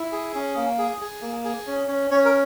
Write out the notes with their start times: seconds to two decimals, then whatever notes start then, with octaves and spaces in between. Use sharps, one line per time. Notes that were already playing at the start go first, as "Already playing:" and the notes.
Already playing: E4
0.12 G#4
0.35 C#4
0.56 A#3
0.78 G#4
1.01 G#4
1.22 A#3
1.45 G#4
1.67 C#4
1.88 C#4
2.11 C#4 C#5
2.25 A#4